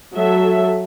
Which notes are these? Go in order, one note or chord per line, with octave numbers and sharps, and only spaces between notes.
F#3 A4 E5